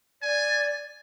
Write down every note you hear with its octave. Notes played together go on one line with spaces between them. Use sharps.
D5 G#5